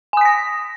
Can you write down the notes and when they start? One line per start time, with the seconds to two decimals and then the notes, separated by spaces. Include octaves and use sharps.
0.13 G#5
0.17 D#6
0.21 B6
0.25 A#6